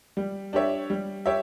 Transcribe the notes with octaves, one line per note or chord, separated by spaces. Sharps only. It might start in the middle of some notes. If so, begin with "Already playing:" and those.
G3
D4 G4 C#5 E5
G3
G4 C#5 E5